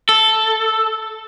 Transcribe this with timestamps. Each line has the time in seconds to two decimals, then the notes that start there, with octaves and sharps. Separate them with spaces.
0.09 A4